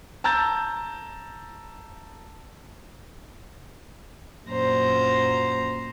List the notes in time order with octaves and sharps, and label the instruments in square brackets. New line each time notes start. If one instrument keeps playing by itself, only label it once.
[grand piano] A5 A#5 E6 G6 A6
[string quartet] F#2 A#2 C5 A#5